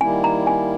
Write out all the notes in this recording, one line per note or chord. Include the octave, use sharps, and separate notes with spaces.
D#3 G3 A#3 E4 G#5
A#5
G#5